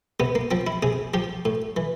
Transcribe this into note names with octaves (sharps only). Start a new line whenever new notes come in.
C3 B3
A#3
F3 C4
E4
C3 G#4
F3 G4
A2
E3